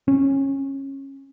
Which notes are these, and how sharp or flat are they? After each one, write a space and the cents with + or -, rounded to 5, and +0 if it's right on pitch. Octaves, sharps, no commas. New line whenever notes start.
C#4 -20